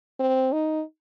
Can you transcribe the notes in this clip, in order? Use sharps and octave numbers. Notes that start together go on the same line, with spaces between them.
C4
D#4